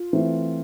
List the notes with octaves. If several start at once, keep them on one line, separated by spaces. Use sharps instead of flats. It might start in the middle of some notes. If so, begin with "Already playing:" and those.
Already playing: F4
E3 A3 C4